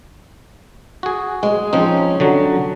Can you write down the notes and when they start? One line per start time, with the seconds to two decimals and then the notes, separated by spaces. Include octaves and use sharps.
1.03 F#4 G#4
1.43 G#3
1.73 F3 C4 C#4 D#4
2.20 D3 F#3 F#4